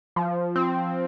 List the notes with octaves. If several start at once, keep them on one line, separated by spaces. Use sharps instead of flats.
F3
C4